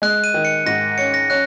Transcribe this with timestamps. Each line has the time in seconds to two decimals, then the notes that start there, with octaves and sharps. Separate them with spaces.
0.02 G#3 F#6
0.24 D#7
0.34 D#3
0.45 C#7
0.66 G#2 A#6
0.98 C#4 C#7
1.14 A#6
1.30 C#4 F#6